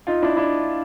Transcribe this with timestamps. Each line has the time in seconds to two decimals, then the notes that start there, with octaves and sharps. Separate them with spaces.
0.07 D#4 F4
0.22 D4 E4
0.37 D4 E4